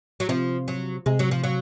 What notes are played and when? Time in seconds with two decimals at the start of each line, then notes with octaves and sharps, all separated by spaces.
0.20 F#3
0.29 C3 F3
0.68 F#3
1.06 C3 G#3
1.19 F#3
1.31 F3
1.44 F#3